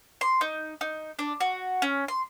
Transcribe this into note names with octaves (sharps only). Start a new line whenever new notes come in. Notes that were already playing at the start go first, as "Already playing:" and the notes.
C6
D#4
D#4
D4
F#4
C#4
C6